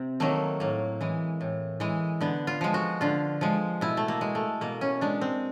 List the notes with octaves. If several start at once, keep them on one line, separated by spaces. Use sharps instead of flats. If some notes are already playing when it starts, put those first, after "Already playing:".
Already playing: C3 C4
D#3 F#3 A3 A#3
A2 A#3
E3 G#3
A2
E3 G#3
D3 B3
F4
F3 G#3
F#4
D3 F4
F3 G#3
B2 E4
A3
A#3
G#3
A3
B2 A#3
C#4
G#3 D4
C4